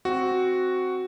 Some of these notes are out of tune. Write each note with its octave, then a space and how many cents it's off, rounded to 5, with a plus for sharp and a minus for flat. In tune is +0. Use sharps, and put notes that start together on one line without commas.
C4 +0 F#4 +0